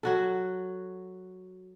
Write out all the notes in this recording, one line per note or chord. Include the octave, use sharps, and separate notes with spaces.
F#3 F#4 A4